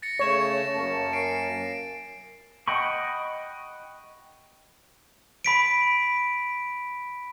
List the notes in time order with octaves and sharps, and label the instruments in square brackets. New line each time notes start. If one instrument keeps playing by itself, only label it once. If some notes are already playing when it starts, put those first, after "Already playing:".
[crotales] A6 A#6 C#7
[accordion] C#3 A3 [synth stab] C#5 [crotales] C#7 E7
[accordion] F#2 A#3 [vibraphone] A5
[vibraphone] A#4 G#5 [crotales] C7 D7
[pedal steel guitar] D#5 F#5 G5 B5 C#6
[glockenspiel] B5 B6 D7